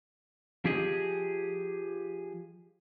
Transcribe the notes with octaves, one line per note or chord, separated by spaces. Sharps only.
F3 G4 G#4 D#5